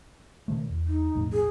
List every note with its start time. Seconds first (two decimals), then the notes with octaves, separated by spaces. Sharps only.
0.48 B2 D#3 A3
0.69 E2
0.87 D#4
1.15 B1 F2 A2
1.33 G#4